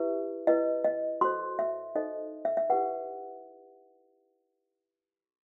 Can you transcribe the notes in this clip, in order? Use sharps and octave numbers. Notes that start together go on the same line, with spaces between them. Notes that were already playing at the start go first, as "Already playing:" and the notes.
Already playing: E4 G4 B4 E5
E4 B4 D#5
D#5
F#4 A4 C5 C6
E5
D#4 A4 C5 D#5
E5
E5
E4 G4 B4 F#5